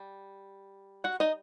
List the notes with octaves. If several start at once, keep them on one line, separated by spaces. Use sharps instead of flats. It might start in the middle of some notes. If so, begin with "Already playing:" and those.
Already playing: G3
F#4 F#5
D#4 D#5